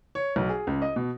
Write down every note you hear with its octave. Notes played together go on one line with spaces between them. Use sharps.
C#5
B1
G#4
C#2
D#5
B2